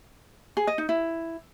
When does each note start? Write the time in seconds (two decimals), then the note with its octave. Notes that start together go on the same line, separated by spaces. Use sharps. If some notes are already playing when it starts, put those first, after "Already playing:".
0.57 G#4
0.67 D#5
0.78 D#4
0.89 E4